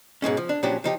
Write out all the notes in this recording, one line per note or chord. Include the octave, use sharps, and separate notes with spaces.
G#2 B2 G#3 C#4
F3
D4
A#2 F3 F#3 C#4 D4 G4
F3 D#4 G4